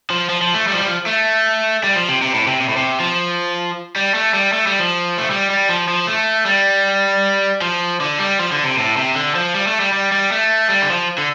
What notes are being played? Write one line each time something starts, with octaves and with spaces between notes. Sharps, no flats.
F3
F3
F3
A3
G3
F3
G3
F3
A3
G3
F3
C3
C3
A2
C3
C3
A2
C3
F3
G3
A3
G3
A3
G3
F3
A3
G3
G3
F3
F3
A3
G3
F3
D3
G3
F3
D3
C3
A2
C3
D3
F3
G3
A3
G3
G3
G3
A3
G3
D3
F3
D3